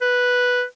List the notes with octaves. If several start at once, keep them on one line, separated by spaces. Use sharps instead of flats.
B4